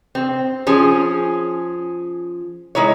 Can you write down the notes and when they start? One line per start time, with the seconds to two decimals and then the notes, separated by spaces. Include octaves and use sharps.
0.15 C4
0.67 F3 C#4 G#4
2.75 G#3 D#4 E4 C#5